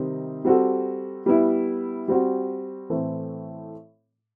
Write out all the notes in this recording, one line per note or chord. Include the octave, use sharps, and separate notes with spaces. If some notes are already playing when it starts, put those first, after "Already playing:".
Already playing: C3 D#3 G3 C4 D#4
G3 C4 F#4 A4
G3 B3 E4
G3 C4 F#4
A2 E3 A3 C4